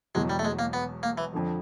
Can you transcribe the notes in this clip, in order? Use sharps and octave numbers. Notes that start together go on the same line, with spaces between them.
E1 E2 B2 F#3 G#3
G3
A3
G#3
A#3
B3
A#3
E3
F2 D3 F3